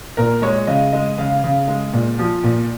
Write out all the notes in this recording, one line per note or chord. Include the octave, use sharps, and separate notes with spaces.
A#2 A#4
G#3 C#5
C#3 D#5
G#3 D#5
C#3 F5
C#3
G#3
A#2
F3
A#2